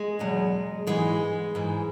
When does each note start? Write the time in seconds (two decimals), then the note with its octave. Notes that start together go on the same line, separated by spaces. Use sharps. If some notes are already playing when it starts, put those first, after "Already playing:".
Already playing: G#3
0.19 E2 B2 F#3
0.87 G#2 E3 G#3
1.55 G#2 E3